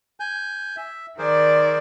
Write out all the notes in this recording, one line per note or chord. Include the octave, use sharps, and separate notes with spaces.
G#5 G6
E5
D#3 G#4 A#4 C5 D5